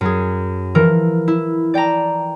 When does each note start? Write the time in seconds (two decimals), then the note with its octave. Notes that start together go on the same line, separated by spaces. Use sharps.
0.01 F#2 G#4
0.75 E3 F3 A#4
1.28 E4
1.74 D5 G5 A5 A#5